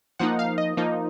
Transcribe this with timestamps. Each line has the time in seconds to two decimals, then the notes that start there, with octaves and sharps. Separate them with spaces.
0.19 F3 A#3 D#4 F#5
0.39 F5
0.58 D#5
0.77 F3 A#3 D#4